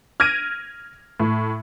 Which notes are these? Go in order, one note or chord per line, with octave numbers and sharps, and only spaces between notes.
F6 G#6 A#6 D7 D#7
A2